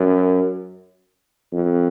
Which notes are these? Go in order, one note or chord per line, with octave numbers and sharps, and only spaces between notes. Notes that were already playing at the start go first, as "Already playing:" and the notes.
Already playing: F#2
F2